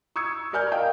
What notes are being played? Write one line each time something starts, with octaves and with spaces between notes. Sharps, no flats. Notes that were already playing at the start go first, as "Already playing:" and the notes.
C#6 D#6 E6 G#6 C#7
A#4 D5 G#5 F6 G6
D#5 F5 G5